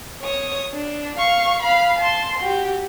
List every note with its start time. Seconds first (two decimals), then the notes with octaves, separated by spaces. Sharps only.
0.23 C#5 D#6
0.74 D4
1.18 F5 C#6
1.62 F5 B5
1.99 A5 C6
2.39 F#4 G4